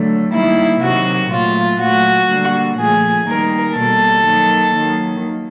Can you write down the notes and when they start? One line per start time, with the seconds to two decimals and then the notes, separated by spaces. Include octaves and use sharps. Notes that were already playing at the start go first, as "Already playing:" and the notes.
Already playing: D3 F#3 A3
0.33 D#3 G3 A#3 E4
0.82 C3 D#3 F#3 F#4
1.31 A#2 F#3 A3 F4
1.80 A#2 F#3 A3 F#4
2.30 D3 G3 A#3
2.79 A#2 F3 A3 G#4
3.28 D#3 G3 A#3 A#4
3.77 B2 G3 A#3 A4
4.26 D#3 F#3 A#3
4.75 D#3 F#3 A#3